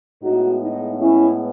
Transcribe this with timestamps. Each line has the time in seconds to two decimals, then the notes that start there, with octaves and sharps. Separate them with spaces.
0.21 A2 G#3 B3 D#4 F#4
0.61 D#4
1.00 C#4 E4